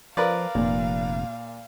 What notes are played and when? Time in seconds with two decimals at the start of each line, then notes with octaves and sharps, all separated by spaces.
0.17 F3 A#4 B4 D5 F5
0.55 F1 A#2